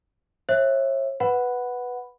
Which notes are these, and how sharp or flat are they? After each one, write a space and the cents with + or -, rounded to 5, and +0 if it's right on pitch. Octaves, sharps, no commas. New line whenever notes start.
C#5 -40 E5 +0
B4 +0 F#5 +0 B5 +0